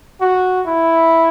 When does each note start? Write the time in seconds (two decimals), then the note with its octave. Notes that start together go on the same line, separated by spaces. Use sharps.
0.21 F#4
0.66 E4